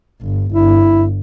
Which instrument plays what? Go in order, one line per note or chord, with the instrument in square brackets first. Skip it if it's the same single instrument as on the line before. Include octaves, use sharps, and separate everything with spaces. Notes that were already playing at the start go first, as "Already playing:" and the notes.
[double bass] G1
[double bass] G1 [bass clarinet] E4